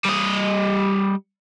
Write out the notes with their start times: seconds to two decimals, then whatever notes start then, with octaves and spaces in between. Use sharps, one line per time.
0.05 G3 D#5